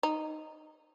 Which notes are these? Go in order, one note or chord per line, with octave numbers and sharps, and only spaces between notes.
D#4